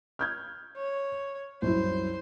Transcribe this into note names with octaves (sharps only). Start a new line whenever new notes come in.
F6 G6 G#6
C#5
C2 F#2 E4 C5